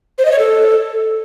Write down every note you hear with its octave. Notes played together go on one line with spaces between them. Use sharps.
C5
D#5
C#5
A4